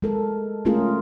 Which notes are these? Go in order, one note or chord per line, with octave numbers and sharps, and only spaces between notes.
G#3 A4 A#4
G#3 A3 C#4 F4 G#4 A#4